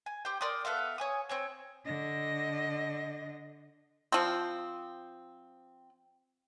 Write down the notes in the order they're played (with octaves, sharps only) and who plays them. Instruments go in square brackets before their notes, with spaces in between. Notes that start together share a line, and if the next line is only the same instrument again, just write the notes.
[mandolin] G#5
G4 C5 G5
A#4 D5 C6 D#6
B3 A4 E5 F5
C#5 G#5 D#6
C4 C#5 G#5
[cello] D3 D#5
[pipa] F3 C4